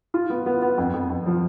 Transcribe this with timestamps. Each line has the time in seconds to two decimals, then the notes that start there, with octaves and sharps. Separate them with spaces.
0.14 F4
0.30 B3
0.46 B3
0.62 B3
0.78 F2
0.93 F2
1.10 F2
1.26 F3